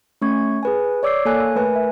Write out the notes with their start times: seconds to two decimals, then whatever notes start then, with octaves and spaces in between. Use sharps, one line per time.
0.22 A3 C#4 C#6 G#6
0.63 G#4 B4 G#5
1.03 C#5 D5 D6 E6 G6 C7
1.25 A#3 A4 C#5 G#5 F#6
1.55 A3 A#4 B4 G#5
1.76 E5